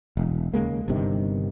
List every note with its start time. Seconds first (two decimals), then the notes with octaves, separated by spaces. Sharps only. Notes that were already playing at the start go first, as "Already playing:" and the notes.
0.17 E1
0.54 D#2 C#3 G#3 A#3
0.88 G1 G2 C3 D#3